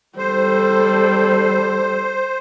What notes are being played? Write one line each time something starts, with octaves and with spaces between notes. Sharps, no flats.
G3 A4 C5